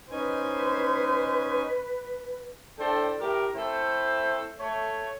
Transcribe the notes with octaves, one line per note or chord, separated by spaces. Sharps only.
C#4 D#4 B4 C5 G#5
A2 D4 A4 C5 D5 G5
A2 G4 A#4
A3 C4 E4 A4 C5
A3 C#5